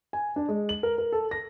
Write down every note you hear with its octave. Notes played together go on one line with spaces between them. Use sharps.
G#5
D4
G#3
F#7
A#4
A#4
A4
A#6